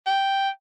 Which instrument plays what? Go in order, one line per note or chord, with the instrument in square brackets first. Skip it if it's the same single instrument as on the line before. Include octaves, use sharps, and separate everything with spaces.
[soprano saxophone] G5